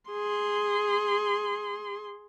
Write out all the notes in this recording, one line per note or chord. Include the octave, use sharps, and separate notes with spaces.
G#4 C6